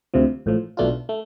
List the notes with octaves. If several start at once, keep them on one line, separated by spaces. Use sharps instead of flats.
D2 C3 F3
A1 A2 F3
B1 B2 A3 D4 F4
A3